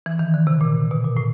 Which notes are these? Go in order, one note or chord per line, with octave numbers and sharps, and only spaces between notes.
E3
D#3
D3
C3
A#2
B2
A#2
A2